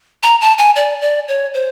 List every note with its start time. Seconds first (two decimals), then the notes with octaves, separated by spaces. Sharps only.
0.23 A#5
0.41 A5
0.58 G#5
0.76 D5
1.01 D5
1.28 C#5
1.54 C5